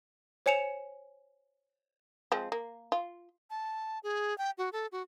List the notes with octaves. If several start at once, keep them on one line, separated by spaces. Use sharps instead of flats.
C5 C#5 G#5 C#7 E7 F7
F3 G#3 C4
A#3
F4
A5
G#4
G5
F#4
A4
F#4